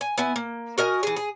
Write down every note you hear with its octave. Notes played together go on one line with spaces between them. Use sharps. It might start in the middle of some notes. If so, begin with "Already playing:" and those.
G#5
B3 E4 G#5
A#3
F#4 A#4 D#5 G#5
E3 G#4
G#4